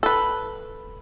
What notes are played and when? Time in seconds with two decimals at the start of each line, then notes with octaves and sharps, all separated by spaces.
0.03 A4 B4